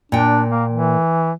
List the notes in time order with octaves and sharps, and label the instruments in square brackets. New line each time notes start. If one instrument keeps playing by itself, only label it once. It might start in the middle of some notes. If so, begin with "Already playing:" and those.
[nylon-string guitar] A#2 G5 [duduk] D4
[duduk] A#3
E3